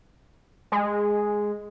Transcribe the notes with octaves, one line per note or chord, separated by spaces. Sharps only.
G#3